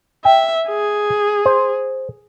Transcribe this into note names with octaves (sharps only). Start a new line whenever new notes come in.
E5 G5
G#4
C5